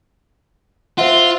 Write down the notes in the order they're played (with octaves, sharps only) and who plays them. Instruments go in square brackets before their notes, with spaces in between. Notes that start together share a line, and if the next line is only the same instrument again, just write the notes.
[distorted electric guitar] F4 [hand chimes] C5 E5 F#5